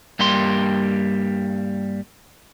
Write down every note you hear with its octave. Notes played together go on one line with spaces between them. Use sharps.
G2 G3 A#3 G4 C6